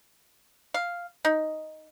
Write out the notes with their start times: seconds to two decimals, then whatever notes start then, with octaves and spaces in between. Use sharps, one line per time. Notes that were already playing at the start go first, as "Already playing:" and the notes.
0.74 F5
1.25 D#4